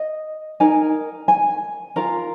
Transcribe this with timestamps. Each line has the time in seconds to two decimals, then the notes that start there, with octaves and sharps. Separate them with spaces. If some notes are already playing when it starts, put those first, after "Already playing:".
Already playing: D#5
0.60 D#4 A#4 G#5
1.28 G#5
1.96 F4 A#4 A#5